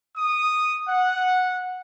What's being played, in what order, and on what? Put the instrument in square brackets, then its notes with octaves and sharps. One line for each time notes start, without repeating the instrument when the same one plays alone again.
[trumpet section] D#6
F#5